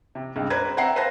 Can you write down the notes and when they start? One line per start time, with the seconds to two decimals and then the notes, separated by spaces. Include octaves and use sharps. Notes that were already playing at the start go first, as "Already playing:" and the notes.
0.15 C3
0.36 C#2 G2 C3
0.50 B4 C5 D5 A#5 G#6
0.77 C4 E5 F#5 A#5 C7
0.96 B4 C5 F5 A5 A#6